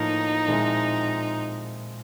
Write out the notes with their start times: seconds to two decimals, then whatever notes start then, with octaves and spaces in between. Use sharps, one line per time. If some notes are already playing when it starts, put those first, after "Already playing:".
Already playing: A2 F3 A#3 D#4
0.47 A#2 F3 G#3 C4 E4